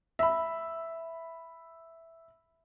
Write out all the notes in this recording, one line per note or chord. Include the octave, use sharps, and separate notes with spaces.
E5 B5